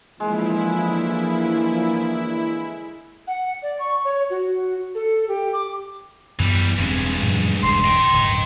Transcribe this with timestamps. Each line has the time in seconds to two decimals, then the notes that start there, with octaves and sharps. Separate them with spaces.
0.20 D3 E3 F3 G#3 A#3 E4
3.27 F#5
3.62 D5
3.79 C#6
4.05 C#5
4.30 F#4
4.95 A4
5.28 G4
5.53 D6
6.39 F#2 D#3 E3 G3 B3
6.78 E1 G2 G#3 C4
7.19 F#2 A#2 E3
7.63 E1 G#2 C#3 C6
7.84 D#5 G5
8.13 D1 G2 C#3